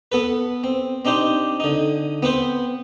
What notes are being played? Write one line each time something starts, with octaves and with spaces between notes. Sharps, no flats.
B3 A4 B4
C4
C4 D4 D#4 G4 C5
D3 D#4
B3 C4 B4 C5